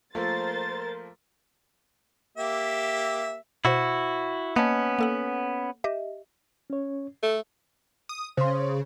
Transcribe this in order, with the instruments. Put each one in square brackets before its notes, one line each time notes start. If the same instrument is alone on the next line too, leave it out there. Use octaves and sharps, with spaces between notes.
[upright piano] F3 A3 A#3 [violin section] A#4 C5 A6
[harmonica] A#3 G4 E5
[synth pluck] B2 C5 [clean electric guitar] E4 F#4
[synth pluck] A#3 D#5 A5 [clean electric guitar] B3 C#4
[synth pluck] A#3 A4 F#5
G4 D#5 E5
[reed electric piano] C#4 C#5
[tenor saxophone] A3 [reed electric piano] A4
[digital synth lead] D#6
[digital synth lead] C#3 [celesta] C5 C6